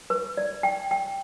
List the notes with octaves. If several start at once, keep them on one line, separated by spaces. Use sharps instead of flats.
B4
D5
G5
G5